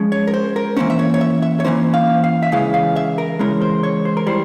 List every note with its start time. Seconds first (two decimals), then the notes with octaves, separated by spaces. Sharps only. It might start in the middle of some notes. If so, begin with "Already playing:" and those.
Already playing: F3 G#3 C#4
0.12 C#5
0.27 A#4
0.34 C5
0.56 A#4
0.77 E3 A#3 C#4 C5
0.90 E5
0.99 C#5
1.14 C#5
1.21 E5
1.42 E5
1.60 C#5
1.64 E3 A#3 C#4 C5
1.94 F5
2.24 F5
2.42 E5
2.52 C#3 E3 G#3 C#4 F5
2.74 F5
2.96 E5
3.18 A#4
3.39 C#3 E3 G#3 C#4 A#4
3.62 C5
3.83 C#5
4.05 C5
4.17 A#4
4.27 E3 G3 C5